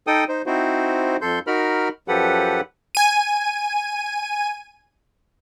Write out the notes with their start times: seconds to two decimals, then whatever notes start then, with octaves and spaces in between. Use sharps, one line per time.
0.07 D#4 A4 G5 D#6
0.28 D#4 C5
0.46 C4 D#4 E4 F#4 C5
1.21 F2 A4 C6 G6
1.47 D#4 F#4 A#4 B5 F6
2.08 F#2 F3 G4 A4 B4 F#5
2.95 G#5 D#7